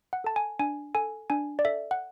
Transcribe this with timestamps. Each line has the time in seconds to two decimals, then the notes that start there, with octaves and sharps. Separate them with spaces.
0.13 F#5
0.24 A4 A5
0.36 G#5
0.59 D4 G#5
0.95 A4 G#5
1.30 D4 G#5
1.59 D5
1.65 A4 E5
1.91 F#5